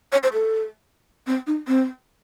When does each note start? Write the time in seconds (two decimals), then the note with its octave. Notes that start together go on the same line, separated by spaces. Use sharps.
0.12 C#5
0.23 C5
0.33 A4
1.27 C4
1.47 D#4
1.68 C4